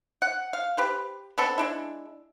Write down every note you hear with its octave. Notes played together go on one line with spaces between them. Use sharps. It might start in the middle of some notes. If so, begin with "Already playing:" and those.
F#5
F5
G4 B4 C5
B3 C4 D4 A4
G#3 D4 E4